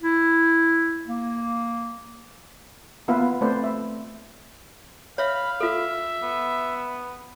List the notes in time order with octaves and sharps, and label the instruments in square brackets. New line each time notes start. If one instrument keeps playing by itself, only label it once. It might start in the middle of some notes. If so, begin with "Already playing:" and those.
[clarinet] E4
A#3
[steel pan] A#3 B3 F4 B4 E5 F5
A3 C4 A4 B4 C5 D5
E5
[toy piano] C#5 E5 [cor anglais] F5 [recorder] B5
[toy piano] F4 A4 [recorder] E5
[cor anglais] B3